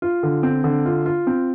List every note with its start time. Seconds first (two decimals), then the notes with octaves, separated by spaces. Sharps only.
0.02 F4
0.23 D3
0.43 C4
0.64 D3
0.86 F4
1.06 F4
1.27 C4